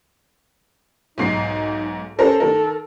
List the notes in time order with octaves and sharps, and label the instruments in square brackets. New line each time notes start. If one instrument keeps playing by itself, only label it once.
[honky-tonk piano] B1 G#2 C7 [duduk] D#4
[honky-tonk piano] C#4 A#4 C5 [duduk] A4
[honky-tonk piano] D#3 A#4